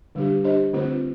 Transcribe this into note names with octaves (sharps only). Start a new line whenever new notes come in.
D3 G3 D4 G4
D4 G4 C5 D#5
D3 A3 C4 F4 C5